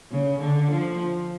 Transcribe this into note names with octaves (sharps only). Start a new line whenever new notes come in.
C#3
D3
F3